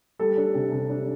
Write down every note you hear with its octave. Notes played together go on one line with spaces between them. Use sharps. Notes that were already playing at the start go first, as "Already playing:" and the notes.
G3 A4
D4
C3
C3
D4